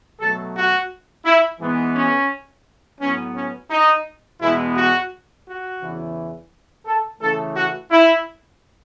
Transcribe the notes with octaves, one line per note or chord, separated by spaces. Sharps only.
B2 F#3 A3 A4
F#4
E4
G#2 E3 G#3 B3
C#4
A2 F#3 B3 C#4
C#4
D#4
E2 B2 G#3 B3 E4
F#4
F#4
E2 C#3 E3
A4
C#3 E3 A3 A4
F#4
E4